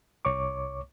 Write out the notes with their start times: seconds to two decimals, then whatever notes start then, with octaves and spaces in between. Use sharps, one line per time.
0.25 C2 C#5 C#6 D6